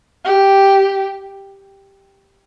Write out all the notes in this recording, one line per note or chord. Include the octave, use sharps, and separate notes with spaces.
G4